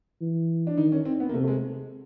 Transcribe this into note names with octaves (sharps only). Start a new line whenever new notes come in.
E3
D4
D#3 D#4
C#4
C4
B3
A#3
C3 A3
A3
G#3